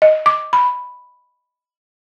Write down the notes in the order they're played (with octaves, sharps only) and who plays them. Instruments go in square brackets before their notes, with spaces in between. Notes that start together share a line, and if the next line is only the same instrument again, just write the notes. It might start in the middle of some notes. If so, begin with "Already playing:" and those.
[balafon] D#5
D6
B5